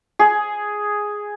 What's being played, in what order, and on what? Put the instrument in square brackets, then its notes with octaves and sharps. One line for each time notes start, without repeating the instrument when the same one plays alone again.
[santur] G#4